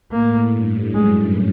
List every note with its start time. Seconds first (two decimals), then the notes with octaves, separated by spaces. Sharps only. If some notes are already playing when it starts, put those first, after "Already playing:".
0.12 A2 A#3
0.52 G2
0.94 F#2 G#3